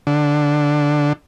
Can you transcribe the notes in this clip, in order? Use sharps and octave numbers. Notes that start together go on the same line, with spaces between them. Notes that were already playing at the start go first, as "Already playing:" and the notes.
D3